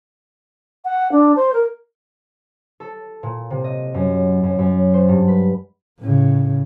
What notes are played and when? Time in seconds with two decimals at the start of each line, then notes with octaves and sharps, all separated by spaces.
0.85 F#5
1.12 D4
1.36 C5
1.53 A#4
2.80 A4
3.23 A#2
3.50 C3
3.64 D#5
3.94 F#2
4.43 F#2
4.59 F#2
4.94 C5
5.09 G2
5.28 B4
5.99 A2 C#3